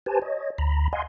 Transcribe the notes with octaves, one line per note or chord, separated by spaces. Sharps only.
G4 B4 C5 G#5 A5
C#5 D#5
D2 A#5 B5
D#5 F5 F#5 G#5 C6